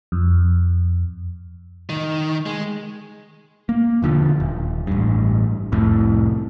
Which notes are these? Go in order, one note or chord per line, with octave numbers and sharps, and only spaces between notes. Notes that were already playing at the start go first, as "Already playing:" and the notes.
F2
D#3
G#3
A#3
E1 D3 F3
D#1
A1 G2
C2 F2 A2